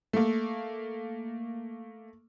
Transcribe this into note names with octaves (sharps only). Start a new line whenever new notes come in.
A3 A#3